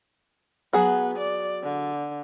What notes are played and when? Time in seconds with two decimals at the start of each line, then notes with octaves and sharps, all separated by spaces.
0.73 F#3 B3 G#4 F#5
1.18 D5
1.63 D3